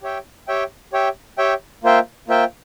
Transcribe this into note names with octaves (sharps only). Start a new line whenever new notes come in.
G4 C#5 E5 G5
G4 C#5 E5 G5
G4 C#5 E5 G5
G4 C#5 E5 G5
A#3 F4 C5 E5 G5
A#3 F4 C5 E5 G5